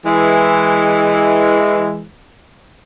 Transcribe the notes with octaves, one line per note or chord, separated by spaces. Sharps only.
E3 G#3